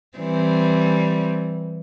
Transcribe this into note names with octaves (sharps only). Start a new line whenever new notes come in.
E3 G3 C4